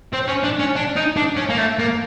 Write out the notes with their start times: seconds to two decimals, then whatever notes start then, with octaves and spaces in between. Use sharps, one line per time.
0.13 C4
0.28 C#4
0.44 D4
0.59 C#4
0.76 D4
0.96 D#4
1.16 D4
1.37 C#4
1.49 A#3
1.58 A3
1.79 A#3